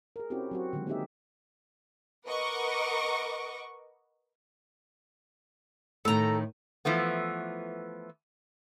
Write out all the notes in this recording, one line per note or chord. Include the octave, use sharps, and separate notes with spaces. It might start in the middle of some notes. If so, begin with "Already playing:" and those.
G#4 A#4
C4 C#4 E4 F#4 G4
F#3 C4 F#4
D3 D#3 F3 F#3 G#3
A#3 C4 D#4 G4 G#4 E5
A#4 B4 D#5 F#5 C#6 D6
A2 D#3 A4 A#5
E3 F3 A3 B3